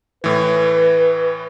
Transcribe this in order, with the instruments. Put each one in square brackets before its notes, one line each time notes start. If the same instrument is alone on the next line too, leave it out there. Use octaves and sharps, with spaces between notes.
[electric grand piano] A2 E3 [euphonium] B4